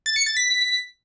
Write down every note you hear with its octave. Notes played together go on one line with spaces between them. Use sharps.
A6
C#7
A6
B6